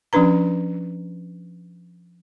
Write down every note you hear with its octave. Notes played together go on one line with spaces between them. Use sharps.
F3 C#4 D4 B4 A#5